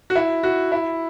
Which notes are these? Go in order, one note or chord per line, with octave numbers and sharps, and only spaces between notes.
F#4
E4
F#4
E4